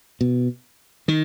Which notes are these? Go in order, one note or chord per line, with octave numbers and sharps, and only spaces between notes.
B2
D#3